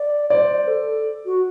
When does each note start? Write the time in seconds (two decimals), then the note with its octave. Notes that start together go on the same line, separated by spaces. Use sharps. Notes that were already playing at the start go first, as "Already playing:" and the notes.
Already playing: D5
0.30 C5 D5
0.68 A4
1.25 F#4